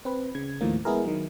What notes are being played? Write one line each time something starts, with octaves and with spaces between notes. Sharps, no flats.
C4 B4
C#3 G#6
D#2 A2 D#3 F3 A#3
G#3 B3 E4 G#4 A#4
D#3 F#3